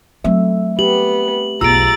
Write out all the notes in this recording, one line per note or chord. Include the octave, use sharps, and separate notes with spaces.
F#3 A3 C4 E5
B3 G4 F#7
B1 E2 F4 G#4 A#5 E6 A6 D7